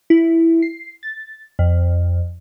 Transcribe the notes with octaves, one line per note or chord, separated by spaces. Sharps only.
E4
C7
A6
F2